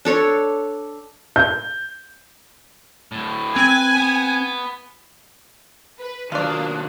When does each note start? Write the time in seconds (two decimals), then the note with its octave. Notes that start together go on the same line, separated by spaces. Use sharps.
0.05 D4 A4 C#5
1.36 G6
3.12 D2 A2
3.56 C4 B4 G#5
3.96 B3
5.99 B4
6.32 D#3 F#3 A#3 D4 F4 D5 D#6 F#6